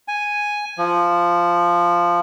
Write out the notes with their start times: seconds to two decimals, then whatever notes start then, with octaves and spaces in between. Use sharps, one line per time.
0.08 G#5
0.78 F3